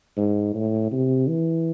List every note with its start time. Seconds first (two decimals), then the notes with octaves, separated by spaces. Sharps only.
0.18 G#2
0.54 A2
0.92 C3
1.28 E3